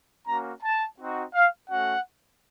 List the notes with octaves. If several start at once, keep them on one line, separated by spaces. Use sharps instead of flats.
A#3 C#4 F#4 A#5
A5
C4 D#4 F#4
F5
A3 C#4 F#4 F#5